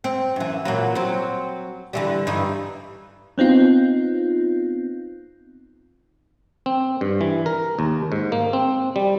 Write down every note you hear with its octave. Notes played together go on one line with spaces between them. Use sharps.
C4
F#2 E3
A#2 E3 F#3
F#3 C4
D3 E3 G3
G2 E3 D#4
B3 C4 D#4 F4
C4
G2
E3
A#4
D#2
G#2
A#3
C4
G3